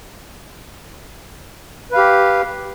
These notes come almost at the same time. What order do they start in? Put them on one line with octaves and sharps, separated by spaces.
B4 F5 G4